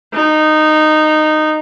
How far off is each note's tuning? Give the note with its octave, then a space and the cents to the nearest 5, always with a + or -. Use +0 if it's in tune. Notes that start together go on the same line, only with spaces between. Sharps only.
D#4 -15